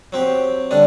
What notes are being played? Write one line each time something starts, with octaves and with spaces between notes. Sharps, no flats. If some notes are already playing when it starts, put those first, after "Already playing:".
F#3 C4 G4
D3 G3 D4